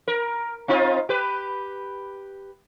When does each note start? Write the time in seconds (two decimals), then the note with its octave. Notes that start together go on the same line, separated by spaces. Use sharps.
0.08 A#4
0.68 C4 D#4 F4
1.09 G4 B4